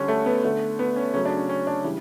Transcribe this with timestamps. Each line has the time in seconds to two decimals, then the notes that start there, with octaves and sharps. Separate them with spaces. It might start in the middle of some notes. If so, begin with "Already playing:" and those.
Already playing: D3 G3 C#4
0.08 A3
0.26 B3
0.44 D3 A3
0.79 B3
0.96 C#4
1.14 C#3 F#3 A3 C#4
1.25 D4
1.37 C#4
1.49 C#4
1.67 D4
1.84 C#3 E3 G3